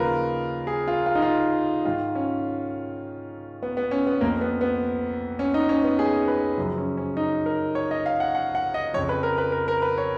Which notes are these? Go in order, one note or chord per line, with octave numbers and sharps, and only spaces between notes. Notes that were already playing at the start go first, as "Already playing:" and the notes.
Already playing: D#2 C#3 F3 F4 A#4 B4
G#4
F4
F4
D#4
F4
G#2 D#3 F4
C#4
B3
B3
C#4
B3
F2 F3 A#3
B3
B3
C#4
D#4
C#4
B3
G#4
B4
F#2 C#3 F3
C#4
C#4
D#4
A#4
C#5
D#5
F5
F#5
F#5
F#5
D#5
F2 C#3 F3 C#5
B4
A#4
B4
A#4
A#4
B4
C#5